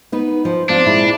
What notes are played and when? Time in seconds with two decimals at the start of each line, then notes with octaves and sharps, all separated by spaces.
0.12 B3 D#4 B4
0.45 F3
0.69 C4 D4 D#4 F4
0.86 A#2 G#3 E4